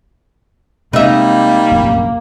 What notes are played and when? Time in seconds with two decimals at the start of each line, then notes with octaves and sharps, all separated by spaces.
0.93 C3 G3 G#3 A#3 D#4 E5
1.72 F1 A#1 F#2